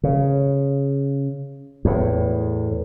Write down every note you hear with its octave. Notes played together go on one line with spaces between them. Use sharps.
C#3
E2 A2